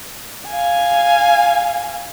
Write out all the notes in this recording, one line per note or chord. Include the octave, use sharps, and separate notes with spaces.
F5 G#5